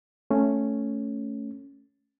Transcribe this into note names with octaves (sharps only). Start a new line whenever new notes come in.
A3 C#4